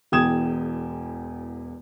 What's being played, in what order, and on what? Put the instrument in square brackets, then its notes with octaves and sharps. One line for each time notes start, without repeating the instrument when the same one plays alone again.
[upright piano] E1 E2 G5 D#6 G#6 E7